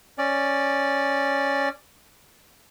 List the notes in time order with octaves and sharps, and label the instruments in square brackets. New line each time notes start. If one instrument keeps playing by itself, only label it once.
[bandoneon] C#4 D5